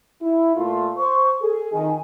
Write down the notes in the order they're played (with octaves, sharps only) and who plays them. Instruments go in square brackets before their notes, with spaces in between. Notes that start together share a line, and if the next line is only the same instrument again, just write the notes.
[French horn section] E4
A#2 A3 F4
[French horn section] C5 [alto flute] C#6
[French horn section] G#4 [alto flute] A4
[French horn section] F2 D#3 [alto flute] G#5